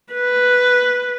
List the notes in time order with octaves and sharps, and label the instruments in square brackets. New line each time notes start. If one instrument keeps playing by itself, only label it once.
[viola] B4